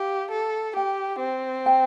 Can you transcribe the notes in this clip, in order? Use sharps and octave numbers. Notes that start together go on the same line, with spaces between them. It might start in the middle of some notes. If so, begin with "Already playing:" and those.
Already playing: G4 F5
A4
G4 G5
C4
G5